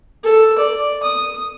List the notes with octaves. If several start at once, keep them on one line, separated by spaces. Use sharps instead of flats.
A4
D5
D#6